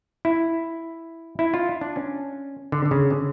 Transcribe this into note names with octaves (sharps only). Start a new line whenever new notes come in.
E4
E4
F4
D4
C#4
D3
D3
C#3
D3